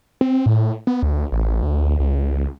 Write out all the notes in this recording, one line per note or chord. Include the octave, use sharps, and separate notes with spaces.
C4
A2
B3
D2
A1
D2
C#2